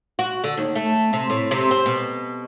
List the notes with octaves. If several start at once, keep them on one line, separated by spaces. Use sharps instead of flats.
F#4
D3
D#2
A3
C3
A2
C3
C4
B2